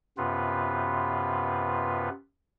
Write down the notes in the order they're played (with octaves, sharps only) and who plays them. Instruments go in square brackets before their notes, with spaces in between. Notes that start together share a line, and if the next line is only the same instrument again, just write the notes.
[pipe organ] F#2 C3 B3 F4 B4